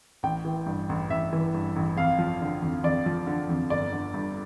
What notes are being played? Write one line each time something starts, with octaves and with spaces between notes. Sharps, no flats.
A1 G5
E3
G2
A1
A1 E5
E3
G2
A1
F2 F5
F3
D3
F2
F2 D5
F3
D3
F2
G1 D5
D3
G2